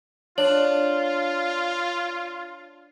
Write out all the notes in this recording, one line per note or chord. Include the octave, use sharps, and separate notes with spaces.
D4 F4 C#5